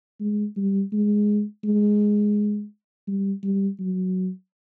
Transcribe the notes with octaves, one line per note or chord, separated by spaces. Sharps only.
G#3
G3
G#3
G#3
G3
G3
F#3